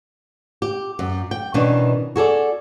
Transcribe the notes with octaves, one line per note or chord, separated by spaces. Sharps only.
G4
F#2
G5
B2 D#3 E3 C#4 D4
F#4 G#4 A4 D5